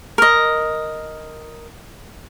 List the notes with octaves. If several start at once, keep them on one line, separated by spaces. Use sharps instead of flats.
A#4 D#5